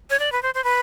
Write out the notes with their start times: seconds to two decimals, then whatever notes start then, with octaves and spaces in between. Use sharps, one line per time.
0.10 C#5
0.19 D5
0.32 B4
0.43 C5
0.55 C5
0.64 B4